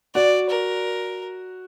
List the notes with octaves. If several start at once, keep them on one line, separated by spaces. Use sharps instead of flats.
F#4 D5
A#4